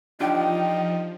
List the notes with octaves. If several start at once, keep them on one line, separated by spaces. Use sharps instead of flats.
F3 D4 D#4 F4 G4 G5